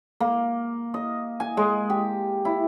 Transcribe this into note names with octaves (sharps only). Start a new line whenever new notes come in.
A#3
D#5
G#5
G#3
G4
E4